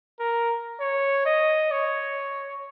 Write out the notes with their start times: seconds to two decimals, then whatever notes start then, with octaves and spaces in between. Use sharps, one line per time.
0.20 A#4
0.80 C#5
1.26 D#5
1.71 C#5